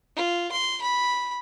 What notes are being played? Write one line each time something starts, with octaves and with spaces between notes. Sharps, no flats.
F4
C6
B5